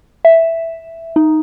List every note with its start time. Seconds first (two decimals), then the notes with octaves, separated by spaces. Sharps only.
0.25 E5
1.16 D#4